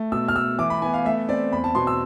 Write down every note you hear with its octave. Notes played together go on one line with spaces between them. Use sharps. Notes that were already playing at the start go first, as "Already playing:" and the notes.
Already playing: A3
B2 E6
F6
A3 E6
E3 D6
B5
B3 G#5
F5
A3 E5
C4 D5
E2 B5
A5
B2 C6
E6